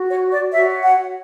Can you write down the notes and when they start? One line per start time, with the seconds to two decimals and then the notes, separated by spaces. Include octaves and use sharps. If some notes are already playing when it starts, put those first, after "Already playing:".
Already playing: F#4
0.09 C#5
0.31 D5
0.52 F#4 C#5 E5
0.83 F#5